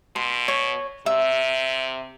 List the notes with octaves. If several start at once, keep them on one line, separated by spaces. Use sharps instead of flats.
B2 C6
C#5
C3 E5